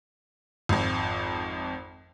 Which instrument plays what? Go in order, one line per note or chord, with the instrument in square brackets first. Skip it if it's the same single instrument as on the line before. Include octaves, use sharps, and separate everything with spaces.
[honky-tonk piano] G#1 F2